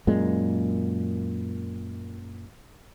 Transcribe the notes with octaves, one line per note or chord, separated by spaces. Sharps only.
F#2 A#2 G#3